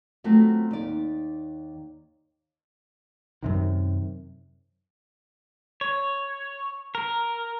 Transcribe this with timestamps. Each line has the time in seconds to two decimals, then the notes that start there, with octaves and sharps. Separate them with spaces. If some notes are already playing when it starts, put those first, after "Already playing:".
0.24 F#3 A3 B3 C4 F4 F#4
0.71 D#2 D5
3.43 F#2 C3 D#3
5.81 C#5
6.95 A#4